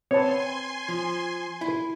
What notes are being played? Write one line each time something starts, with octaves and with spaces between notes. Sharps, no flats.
C4 B4 C#5 G#5 A5 C6
F3
E4